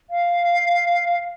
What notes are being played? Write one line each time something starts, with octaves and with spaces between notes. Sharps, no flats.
F5